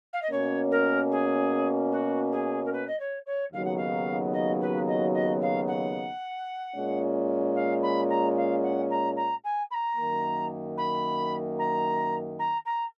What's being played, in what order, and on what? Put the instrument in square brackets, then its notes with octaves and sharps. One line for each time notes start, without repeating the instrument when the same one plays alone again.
[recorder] F5
D#5
[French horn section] B2 A#3 C#4 [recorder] C#5
[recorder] A#4
G#4
F#4
G#4
A#4
B4
D#5
C#5
C#5
[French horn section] D#2 C#3 F#3 B3 D#4 [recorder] F5
[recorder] F#5
F5
D#5
B4
D#5
D#5
F5
F#5
[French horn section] A#2 G#3 C#4
[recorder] F5
B5
A#5
F5
F#5
A#5
A#5
G#5
B5
A#5
[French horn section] F#2 D#3 A#3
[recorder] B5
A#5
A#5
A#5